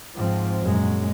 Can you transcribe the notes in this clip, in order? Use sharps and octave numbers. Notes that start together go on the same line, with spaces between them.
G#2 F3 C4
F#2 A#2 G#3